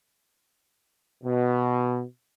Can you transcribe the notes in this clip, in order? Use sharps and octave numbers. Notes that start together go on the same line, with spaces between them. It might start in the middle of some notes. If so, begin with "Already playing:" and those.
B2